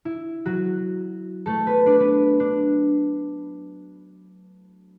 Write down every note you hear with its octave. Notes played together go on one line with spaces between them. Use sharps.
E4
F#3 F#4
A3 A4
B3 B4
D4 D5
B3 B4
D4